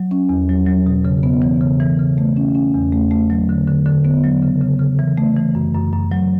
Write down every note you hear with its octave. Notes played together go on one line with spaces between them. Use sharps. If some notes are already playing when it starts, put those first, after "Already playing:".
Already playing: F#3
C#4
E2
F#3
F#3
B2
C#3
B3
E3
C#3
E3
C#3
A3
C#4
C#4
E2
A3
A3
F#3
D3
D3
D3
B3
F#3
C#3
C#3
C#3
E3
A3
E3
F#2
F#2
F#2
F#3